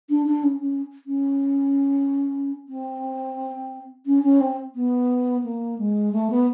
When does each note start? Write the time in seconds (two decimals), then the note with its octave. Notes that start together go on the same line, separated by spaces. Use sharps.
0.09 D4
0.26 D4
0.43 C#4
0.61 C#4
1.06 C#4
2.68 C4
4.06 C#4
4.23 C#4
4.41 C4
4.75 B3
5.44 A#3
5.79 G#3
6.13 A3
6.30 B3